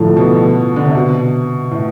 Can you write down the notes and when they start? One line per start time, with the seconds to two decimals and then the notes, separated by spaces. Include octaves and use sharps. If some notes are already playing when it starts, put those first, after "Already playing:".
Already playing: A2 D3 F3 A3 E4
0.17 B2
0.76 D3
0.86 C3
0.95 B2
1.71 A2